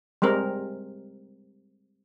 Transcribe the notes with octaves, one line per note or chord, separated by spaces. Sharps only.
G3 G#3 C4 A#4